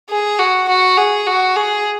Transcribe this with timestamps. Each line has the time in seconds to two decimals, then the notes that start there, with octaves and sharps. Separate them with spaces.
0.10 G#4
0.39 F#4
0.68 F#4
0.97 G#4
1.26 F#4
1.56 G#4